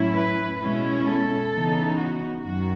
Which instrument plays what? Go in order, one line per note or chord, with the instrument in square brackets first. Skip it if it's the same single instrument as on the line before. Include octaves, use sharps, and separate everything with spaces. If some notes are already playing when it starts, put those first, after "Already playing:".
Already playing: [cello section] A2 F#3 C#4 E4
B4
B2 G#3 C#4 E4
A4
C#3 E3 B3 D#4
F#4
F#2 D#3 F#4